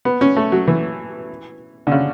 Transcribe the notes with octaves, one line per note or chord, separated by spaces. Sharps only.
B3
C#4
A3
F#3
E3
D3
C#3